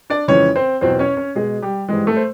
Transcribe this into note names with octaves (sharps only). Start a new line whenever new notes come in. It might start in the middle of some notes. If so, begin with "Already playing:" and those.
D4 D5
F2 C#3 E3 G#3 C#4 C#5
C4 C5
E2 B2 F#3 C4 C5
C#4 C#5
C#4 C#5
B2 G#3 G#4
G3 G4
G#2 E3 G3 G#3 G#4
A3 A4
C5